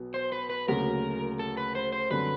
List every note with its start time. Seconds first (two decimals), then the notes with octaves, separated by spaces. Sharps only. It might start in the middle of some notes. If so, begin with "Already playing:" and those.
Already playing: B1 B2 B3
0.14 C5
0.32 B4
0.50 B4
0.67 D2 C#3 F#3 A#3 A#4
1.39 A4
1.57 B4
1.75 C5
1.92 C5
2.10 F#2 D3 G3 C4 B4